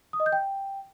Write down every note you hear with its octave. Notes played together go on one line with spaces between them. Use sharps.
D#6
D#5
G6
G5